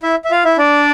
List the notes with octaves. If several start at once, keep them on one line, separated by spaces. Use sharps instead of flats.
E4 E5
E5
F4 F5
E4 E5
D4 D5